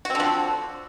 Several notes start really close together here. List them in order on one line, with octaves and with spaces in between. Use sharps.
F#4 C4 D3 F3